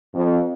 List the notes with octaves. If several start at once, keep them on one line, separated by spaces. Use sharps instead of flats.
F2